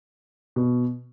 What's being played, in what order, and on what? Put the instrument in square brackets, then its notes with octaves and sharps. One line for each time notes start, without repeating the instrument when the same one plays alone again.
[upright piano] B2